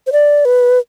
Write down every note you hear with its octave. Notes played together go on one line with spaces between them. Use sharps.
C5
D5
B4